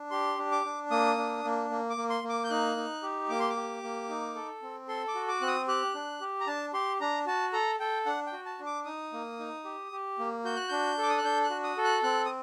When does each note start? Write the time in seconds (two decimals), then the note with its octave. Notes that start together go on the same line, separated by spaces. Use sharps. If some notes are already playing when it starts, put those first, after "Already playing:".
Already playing: D4
0.11 G4 C6
0.38 D4
0.51 D6
0.65 D4
0.90 A#3 D#6
1.17 D4
1.44 A#3
1.70 A#3
1.90 D6
1.97 A#3
2.10 C6
2.24 A#3
2.29 D6
2.44 G6
2.50 D#4 F#6
2.77 D#4
3.03 G4
3.29 A#3 D6
3.39 C6
3.50 D6
3.56 G4
3.83 A#3
4.09 D#4
4.35 A4
4.62 C4
4.88 A4 C6
5.08 D6
5.15 F#4
5.28 D6
5.41 C4 F#6
5.48 D#6
5.68 G4 F#6
5.95 D4
6.21 G4
6.40 A#5
6.47 D4 A5
6.74 G4 C6
7.01 D4 A#5
7.26 F#4 A5
7.53 A4 A#5
7.80 A4 G5
8.06 D4 F#5
8.26 G5
8.33 F#4
8.46 A5
8.59 D4
8.66 D6
8.85 D#4 D#6
9.13 A#3
9.39 D#4
9.65 G4
9.92 G4
10.19 A#3
10.44 F#4 G6
10.57 F#6
10.69 D4 G6
10.98 A4 D6
11.10 D#6
11.18 F#6
11.24 D4 G6
11.44 F#6
11.50 F#4
11.64 D#6
11.77 A4
11.84 F#6
12.03 C4 F#6
12.25 D#6